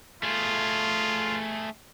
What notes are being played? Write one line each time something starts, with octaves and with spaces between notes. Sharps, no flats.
A3 F4 G#4